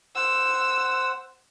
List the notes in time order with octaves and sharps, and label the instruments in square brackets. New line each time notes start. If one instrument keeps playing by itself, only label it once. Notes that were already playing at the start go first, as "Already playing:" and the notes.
[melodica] C5 F#5 [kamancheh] E6